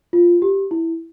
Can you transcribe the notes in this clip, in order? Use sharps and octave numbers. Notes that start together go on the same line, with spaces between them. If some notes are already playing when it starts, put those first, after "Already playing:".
F4
G4
E4